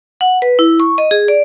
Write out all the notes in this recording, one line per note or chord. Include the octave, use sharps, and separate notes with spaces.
F#5
B4
E4
C#6
D#5
G#4
D5